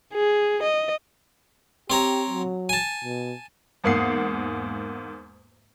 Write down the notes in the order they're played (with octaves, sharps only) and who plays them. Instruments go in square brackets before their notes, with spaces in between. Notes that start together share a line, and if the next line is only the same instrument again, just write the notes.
[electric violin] G#4
D#5
[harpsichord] C4 C#5 A#5 [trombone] G4
[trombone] F#3
[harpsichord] G#5 A5
[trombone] B2
[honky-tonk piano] E2 G#2 A#3 F#5 D#6 C7